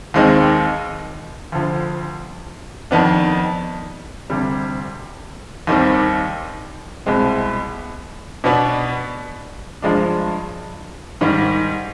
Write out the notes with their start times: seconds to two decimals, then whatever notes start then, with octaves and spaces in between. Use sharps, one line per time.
0.14 D#2 D#3 G#3 C4 D#4
1.52 D2 D3 F3
2.91 F2 D#3 B3 D4
4.30 D2 C3 G3
5.67 D#2 D#3 G3 C4
7.06 C2 B2 G#3 C4
8.44 B2 B3 D4
9.82 G2 F3 G#3 D4
11.21 G#2 D#3 G3